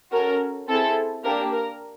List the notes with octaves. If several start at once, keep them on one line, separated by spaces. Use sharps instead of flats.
C#4 F#4 A4 A#4
C4 E4 G#4 A4
A#3 D4 G4 A#4
A#4